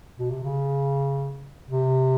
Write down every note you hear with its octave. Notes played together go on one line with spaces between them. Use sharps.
B2
C3
C#3
C3